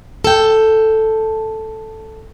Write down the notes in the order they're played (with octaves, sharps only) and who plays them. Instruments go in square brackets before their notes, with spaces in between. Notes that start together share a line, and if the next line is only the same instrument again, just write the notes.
[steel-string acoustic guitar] A4 G5